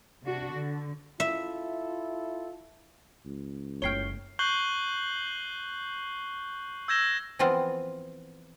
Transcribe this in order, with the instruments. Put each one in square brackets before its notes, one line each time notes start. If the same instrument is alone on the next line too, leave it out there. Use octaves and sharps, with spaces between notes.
[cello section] C3 D4 F#4
D3
[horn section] E4 F4 A4 [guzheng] E5
[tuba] C#2
[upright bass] F#1 A3 [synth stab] C#5 G5 [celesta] F6 C7 G7
[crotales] C#6 F#6 G6 C7 F#7 G7
E6 G6 G#6 A#6 E7 G7
[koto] E3 F3 B3 C4 F4